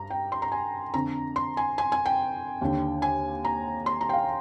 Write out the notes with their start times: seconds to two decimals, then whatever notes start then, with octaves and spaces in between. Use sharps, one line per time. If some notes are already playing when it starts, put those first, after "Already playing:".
Already playing: G2 A#5
0.10 G5
0.32 C6
0.42 A#5
0.52 G#5
0.93 F2 D3 A#5
1.36 C6
1.57 G#5
1.78 G#5
1.92 G#5
2.06 G5
2.62 D#2 D3
3.02 G#5
3.45 A#5
3.86 C6
4.01 A#5
4.09 G5
4.13 F5